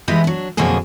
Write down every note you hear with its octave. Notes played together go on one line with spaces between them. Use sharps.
E3 G#3 B3 E4 G4 D#5
F#3 D4
F2 B2 D3 F#3 A#3 G#4